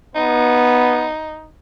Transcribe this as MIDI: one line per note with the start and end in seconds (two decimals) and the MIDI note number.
0.15 1.09 59
0.15 1.47 63